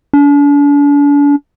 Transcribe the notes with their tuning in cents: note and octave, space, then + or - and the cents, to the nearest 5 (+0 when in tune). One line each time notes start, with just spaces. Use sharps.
D4 -40